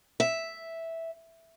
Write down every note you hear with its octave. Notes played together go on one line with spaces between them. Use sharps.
E5